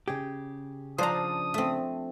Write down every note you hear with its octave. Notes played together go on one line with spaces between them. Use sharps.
C#3 G4 G#4
F3 D4 F4 C5 A#5 D#6
A3 C4